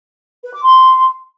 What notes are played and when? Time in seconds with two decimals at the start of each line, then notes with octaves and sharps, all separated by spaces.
0.45 B4
0.54 D6
0.63 C6